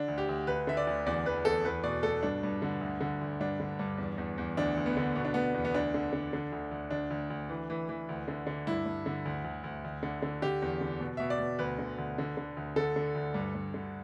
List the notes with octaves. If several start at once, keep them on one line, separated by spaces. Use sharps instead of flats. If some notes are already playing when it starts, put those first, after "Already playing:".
Already playing: D3 D4
D2
G4
D2
D2 B4
D3 E5
D5
D2
E2 D5
E2 B4
E2 A4
E2 B4
B2 D5
B2 A4
G2 D4
G2
D3
D2
D3
D2
G2 D4
D3
G2
E2
E2
E2
D2 D4
D2
B3
D3
B2 B3
D4
B2 B3
E2
B3
D2 D4
D3
D3
D3
D2
D2
D2 D4
D2
D2
E3
E3
E3
D2
D3
D3
G2 E4
G2
D3
D2
D2
D2
D2
D3
D3
D3 G4
E2
D3
B2
B2 E5
D5
B2
D2 B4
D3
D2
D3
D3
D2
D3 A4
D3
D2
G2
G2
D3